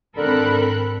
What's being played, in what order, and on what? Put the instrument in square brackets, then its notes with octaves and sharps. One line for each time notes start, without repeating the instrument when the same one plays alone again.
[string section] G#1 B5 F#6 [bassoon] D3 [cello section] C4 A4 A#4